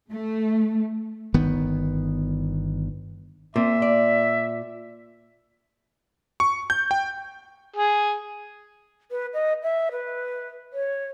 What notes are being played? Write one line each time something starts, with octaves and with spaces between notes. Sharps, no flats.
A3
G1 D#3 B3
A#2 C4 E5
D5
C#6
G6
G5
G#4
B4
D#5
E5
B4
C#5